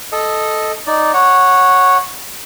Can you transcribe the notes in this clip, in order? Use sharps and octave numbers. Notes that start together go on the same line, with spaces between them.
A4 D#5
D#4 D5
C#5 F#5